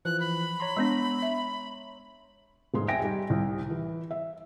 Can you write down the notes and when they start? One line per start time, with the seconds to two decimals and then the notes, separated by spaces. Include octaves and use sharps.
0.05 E3 F3 F#6
0.20 B5
0.60 C#5 A#5 C6
0.77 G#3 B3 D4
1.22 E5
2.74 F1 G#2 G#4 C6
2.88 E5 G5 G#5 A#6 D7
3.00 G3 D#4
3.30 C2
3.70 E3
4.11 E5